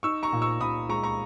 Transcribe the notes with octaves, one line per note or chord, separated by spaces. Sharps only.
D#4 C#6 E6
A#5 C#6
A#2
C#6 E6
A#2 B5 D#6
G#3 A#5 C#6
A#5 C#6